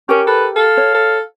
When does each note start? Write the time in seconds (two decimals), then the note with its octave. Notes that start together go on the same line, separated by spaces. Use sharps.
0.09 C#4 G4 A#4
0.27 A4 B4
0.56 A4 F5
0.77 C#5
0.95 A4